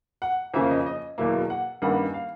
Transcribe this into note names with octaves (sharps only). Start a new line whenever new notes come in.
F#5
F2 C#3 F3 A#3 C#4 E5
D#5
D#5
E2 B2 F#3 A#3 E5
F#5
G2 D#3 G3 A#3 C#4 F#5
F5